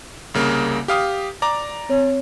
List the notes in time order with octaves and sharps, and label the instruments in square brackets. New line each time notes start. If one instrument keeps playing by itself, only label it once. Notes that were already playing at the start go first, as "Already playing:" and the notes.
[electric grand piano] C2 C#3 A#3
G4 F5 D#6
D5 A#5 D6
[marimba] C4 C#5